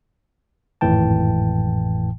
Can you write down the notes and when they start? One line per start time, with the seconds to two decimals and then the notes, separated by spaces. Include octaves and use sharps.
0.81 G#1 F2 A2 E3 G5 A5